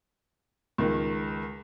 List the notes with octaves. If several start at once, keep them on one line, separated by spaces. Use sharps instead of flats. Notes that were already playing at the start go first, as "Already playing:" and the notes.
C#2 D#3